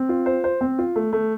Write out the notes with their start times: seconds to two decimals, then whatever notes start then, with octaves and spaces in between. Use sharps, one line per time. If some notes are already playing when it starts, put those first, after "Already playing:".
Already playing: C4
0.09 F4
0.26 C5
0.44 C5
0.61 C4
0.79 F4
0.96 A3
1.13 A3